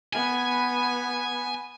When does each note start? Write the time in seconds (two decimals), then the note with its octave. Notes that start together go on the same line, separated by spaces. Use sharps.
0.13 B3 G#5